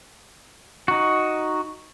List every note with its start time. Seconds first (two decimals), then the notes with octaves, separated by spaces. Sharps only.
0.88 D#4 F#4